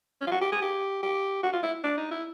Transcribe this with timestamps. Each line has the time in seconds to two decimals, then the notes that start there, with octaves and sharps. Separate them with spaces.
0.21 C#4
0.27 F4
0.32 F#4
0.42 G4
0.52 G#4
0.62 G4
1.03 G4
1.43 F#4
1.53 F4
1.63 E4
1.84 D4
1.97 D#4
2.11 E4